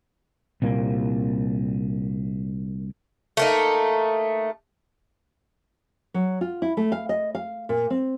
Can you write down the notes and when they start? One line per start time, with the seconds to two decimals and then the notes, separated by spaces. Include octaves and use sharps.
0.62 C2 A#2 A#3
3.37 A3 A#3 D#4
6.14 F#3
6.41 F4
6.62 E4
6.77 A3
6.92 F5
7.09 D#5
7.35 F5
7.69 A#2
7.90 C4